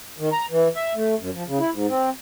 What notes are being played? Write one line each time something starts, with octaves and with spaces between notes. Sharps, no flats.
D#3
A#5
E3
E5
A3
F#2
F3
C#3
E4
G#2
C4